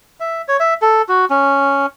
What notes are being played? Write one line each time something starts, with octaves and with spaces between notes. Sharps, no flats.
E5
C#5
E5
A4
F#4
C#4